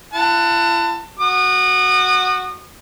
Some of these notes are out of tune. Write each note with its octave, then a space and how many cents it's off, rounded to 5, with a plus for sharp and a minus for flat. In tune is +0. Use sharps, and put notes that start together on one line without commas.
E4 +45 F#5 +0 A5 +25
F#4 +0 D#6 -35